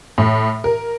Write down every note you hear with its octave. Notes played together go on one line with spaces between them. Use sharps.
A2
A#4